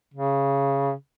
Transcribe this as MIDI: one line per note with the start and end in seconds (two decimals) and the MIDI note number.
0.14 0.93 49